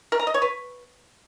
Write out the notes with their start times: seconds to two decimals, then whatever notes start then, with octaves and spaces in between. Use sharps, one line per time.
0.12 A#4
0.19 A#5
0.27 D#5
0.34 C#5
0.42 B4